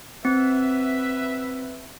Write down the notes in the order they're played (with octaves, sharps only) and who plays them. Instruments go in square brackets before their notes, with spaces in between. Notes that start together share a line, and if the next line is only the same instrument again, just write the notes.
[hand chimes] C4 [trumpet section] B4 E5